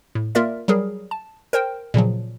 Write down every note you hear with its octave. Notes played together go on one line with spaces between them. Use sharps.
A2
A#3 F4 A#4 D5 E5
F#3 G3 G#4 A#4
A5
A#4 C5 G5
A#2 C#3 F3 F#3